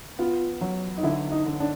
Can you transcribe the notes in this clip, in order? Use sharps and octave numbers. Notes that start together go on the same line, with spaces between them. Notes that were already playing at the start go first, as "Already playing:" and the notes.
B3 F4
F#3
D#4
D3 E4
D#4
D3
D4